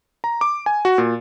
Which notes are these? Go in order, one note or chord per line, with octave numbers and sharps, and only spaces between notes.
A#5
D6
G#5
F#4
A#2